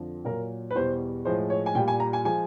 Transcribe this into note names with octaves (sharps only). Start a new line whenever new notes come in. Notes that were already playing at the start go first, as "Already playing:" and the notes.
Already playing: F2 D3 F3
A#2 F#3 A#4
B4
E2 B2 G3 C5
A2 F3 G#3 C5
C#5
G#5
A#2 G3 G5
G#5
A#5
G#5
F3 G#3 G#5